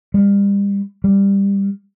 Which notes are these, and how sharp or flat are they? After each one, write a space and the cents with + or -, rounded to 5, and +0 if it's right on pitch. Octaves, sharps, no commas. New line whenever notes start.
G3 +35
G3 +15